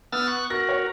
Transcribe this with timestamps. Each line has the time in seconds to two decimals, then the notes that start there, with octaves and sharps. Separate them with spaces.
0.12 B3 E6 F6 A6
0.27 C#6 F#6
0.50 F#4 A#4 A#6
0.69 C#5